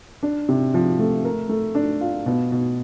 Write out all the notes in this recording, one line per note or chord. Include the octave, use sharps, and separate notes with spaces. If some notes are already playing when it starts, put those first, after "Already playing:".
D4
C3
F3
A3
A#4
A3
D4
F4
B2
B2